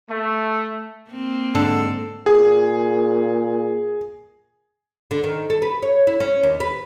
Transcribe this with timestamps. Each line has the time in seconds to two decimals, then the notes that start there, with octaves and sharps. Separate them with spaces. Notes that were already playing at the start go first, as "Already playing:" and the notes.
0.10 A3
1.10 A#3 C4
1.55 G#2 D3 A4
2.26 A#2 G#4
5.11 D3
5.24 D#3
5.50 A4
5.62 B4
5.82 C#5
6.07 E4
6.20 C#4
6.43 D#2
6.60 B4